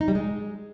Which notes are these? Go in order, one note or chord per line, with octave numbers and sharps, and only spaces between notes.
D#4
G3
G#3